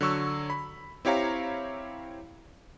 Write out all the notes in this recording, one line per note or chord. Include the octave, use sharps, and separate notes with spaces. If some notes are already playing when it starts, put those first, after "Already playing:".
D3 F#3 C#6 E6
B5
C4 E4 G4 C#5 F5 A#5